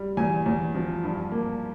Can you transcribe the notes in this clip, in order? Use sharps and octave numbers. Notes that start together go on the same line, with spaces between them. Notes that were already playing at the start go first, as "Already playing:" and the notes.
Already playing: G3
E2 G#5
E2
F3
G2
A#3